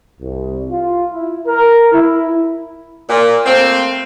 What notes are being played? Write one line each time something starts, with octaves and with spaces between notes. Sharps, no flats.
C2
F4
E4
A#4
E4
A#2
A3 A#3 C4